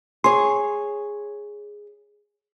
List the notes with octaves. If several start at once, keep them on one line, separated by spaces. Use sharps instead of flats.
G#4 C#5 C6